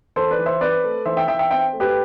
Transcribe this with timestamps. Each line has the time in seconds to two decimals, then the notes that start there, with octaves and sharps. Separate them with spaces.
0.16 E3 A4 C5
0.31 B4 D5
0.39 E3
0.46 C5 E5
0.61 C4 B4 D5
0.84 A3
1.06 E3 C5 E5
1.17 E5 G5
1.28 E3 E5 G5
1.39 E5 G5
1.51 C4 E5 G5
1.73 A3
1.80 G4 B4